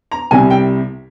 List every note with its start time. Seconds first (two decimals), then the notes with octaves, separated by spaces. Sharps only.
0.12 A#5
0.31 C2 C3 G3 G#5
0.50 G5